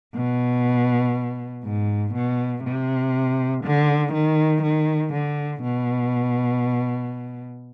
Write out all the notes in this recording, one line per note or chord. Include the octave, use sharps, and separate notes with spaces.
B2
G#2
B2
C3
D3
D#3
D#3
D3
B2